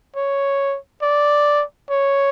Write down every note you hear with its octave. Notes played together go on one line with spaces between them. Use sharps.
C#5
D5
C#5